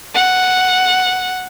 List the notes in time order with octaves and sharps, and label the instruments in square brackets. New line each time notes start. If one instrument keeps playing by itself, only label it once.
[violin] F#5